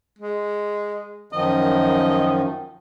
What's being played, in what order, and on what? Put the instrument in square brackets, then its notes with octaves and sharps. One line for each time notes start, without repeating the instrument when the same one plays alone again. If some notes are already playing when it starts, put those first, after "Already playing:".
[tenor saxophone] G#3
[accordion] F#2 D#3 F3 [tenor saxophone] D#5